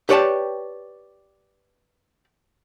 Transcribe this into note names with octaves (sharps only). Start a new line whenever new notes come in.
G4 B4 C#5 D5 G5 A5